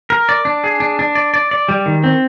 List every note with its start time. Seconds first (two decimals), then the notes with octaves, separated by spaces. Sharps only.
0.10 A#4
0.29 D5
0.45 D4
0.64 G#4
0.80 D4
0.99 D4
1.15 D5
1.34 D5
1.51 D5
1.69 G3
1.86 D#3
2.04 C4